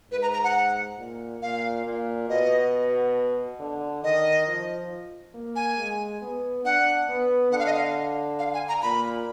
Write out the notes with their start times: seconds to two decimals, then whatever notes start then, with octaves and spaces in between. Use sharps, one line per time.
0.11 G#2 B4
0.22 A#5
0.33 A#5
0.44 F#5
0.98 A#2
1.42 A#2 F5
1.85 A#2
2.29 B2 D#5
3.60 D3
4.03 D#3 D#5
4.47 F3
5.34 A#3
5.56 G#5
5.78 G#3
6.21 B3
6.64 D4 F#5
7.08 B3
7.52 D3 F#5
7.59 F5
7.66 D#5
7.74 F5
8.39 F5
8.54 G#5
8.68 A#5
8.82 A#2 B5